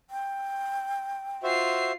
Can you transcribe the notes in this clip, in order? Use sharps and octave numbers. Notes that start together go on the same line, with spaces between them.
G5
F4 F#4 C5 E5 C7